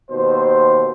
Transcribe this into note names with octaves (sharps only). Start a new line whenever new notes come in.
D#2 B2 C5